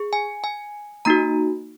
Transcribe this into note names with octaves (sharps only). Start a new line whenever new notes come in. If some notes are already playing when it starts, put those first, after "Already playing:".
Already playing: G#4
G#5
G#5
A#3 D#4 F#4 A#5